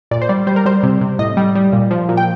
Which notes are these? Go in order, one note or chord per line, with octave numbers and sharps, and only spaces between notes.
A#2 D5
C5
G3 D5
G3 C5
A#4
G3 C5
C3
C3
A2 D#5
G3
G3
A#2
F3
A#2
G5